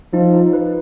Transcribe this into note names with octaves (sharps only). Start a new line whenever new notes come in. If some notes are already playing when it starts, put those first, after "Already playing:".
F3 D#4
D#4
B4